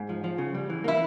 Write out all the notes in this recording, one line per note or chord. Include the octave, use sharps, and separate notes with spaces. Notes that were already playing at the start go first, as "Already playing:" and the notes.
Already playing: G#2
F3
F3
C#3
G3
E3
A#3 E4